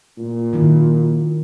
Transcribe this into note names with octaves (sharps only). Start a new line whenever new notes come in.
A#2
D#3 F#3 E4